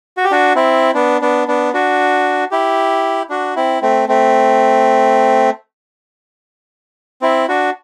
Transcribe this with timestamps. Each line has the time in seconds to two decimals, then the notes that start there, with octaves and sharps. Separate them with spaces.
0.17 F#4
0.24 G4
0.31 D4 F#4
0.56 C4 E4
0.95 B3 D4
1.22 B3 D4
1.48 B3 D4
1.73 D4 F#4
2.51 E4 G4
3.30 D4 F#4
3.56 C4 E4
3.82 A3 C4
4.08 A3 C4
7.22 C4 E4
7.48 D4 F#4